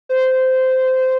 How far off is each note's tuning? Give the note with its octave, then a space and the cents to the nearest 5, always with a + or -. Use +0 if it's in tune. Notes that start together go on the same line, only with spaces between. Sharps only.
C5 -15